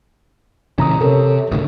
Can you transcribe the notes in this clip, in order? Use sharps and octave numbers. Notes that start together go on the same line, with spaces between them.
A#2 C#3 E3 C#4 A#5 D#6
C3 A4 A#4 C#5
D2 A2 C#3